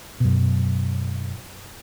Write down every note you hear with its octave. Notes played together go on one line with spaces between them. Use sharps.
F#2 B2